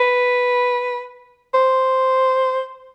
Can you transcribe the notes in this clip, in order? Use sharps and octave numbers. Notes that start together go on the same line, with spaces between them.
B4
C5